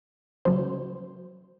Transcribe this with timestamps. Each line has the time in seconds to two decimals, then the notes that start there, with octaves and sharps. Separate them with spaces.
0.45 C#3 F#3 C5